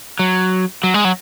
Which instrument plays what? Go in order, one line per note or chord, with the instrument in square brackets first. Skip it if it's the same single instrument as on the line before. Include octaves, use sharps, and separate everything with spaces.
[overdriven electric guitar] F#3
F#3
G#3
F#3